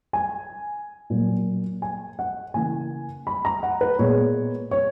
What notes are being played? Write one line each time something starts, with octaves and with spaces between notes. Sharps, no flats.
G#5
A#2 F#3 A#3
G#5
F#5
C#3 E3 A#3 G#5
B5
A#5
F#5
B4
A#2 G#3 B3 C#5
C#5